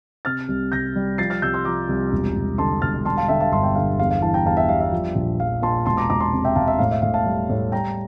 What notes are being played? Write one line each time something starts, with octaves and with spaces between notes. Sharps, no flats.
C3 F6 A6
C2
C2 G6 A#6
G3
F3 A6 C7
F6 A6
C2 E6 G6
C6 E6
F3 A#5 D6
C2
E1
E1
D3 A5 C6
E1 F6 A6
G3 A5 C6
F5 A5
D3 E5 G5
F5 A5
G1 A5 C6
E5 G5
D3 F5
E2 F5
F5
E3 F5 A5
G5 A#5
E2 F5 A5
E5 G5
G3 F5
E5
F3
A#1
F3 F5
A#2 A5 C6
E1 A5 C6
A#5 D6
E1 A#5 D6
A5 C6
C3
E5 G5
E1 F5 A5
E5
A2 F5
E5
A2 F5
F5 A5
G3
A2
G3 G5 A#5